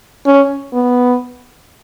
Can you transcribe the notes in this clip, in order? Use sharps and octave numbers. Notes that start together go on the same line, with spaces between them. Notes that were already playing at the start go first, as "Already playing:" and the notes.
C#4
B3